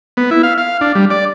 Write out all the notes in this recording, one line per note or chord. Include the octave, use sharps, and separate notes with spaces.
B3
E4
F5
F5
D4
G3
D5